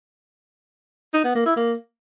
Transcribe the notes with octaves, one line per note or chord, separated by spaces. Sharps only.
D#4
B3
A#3
E4
A#3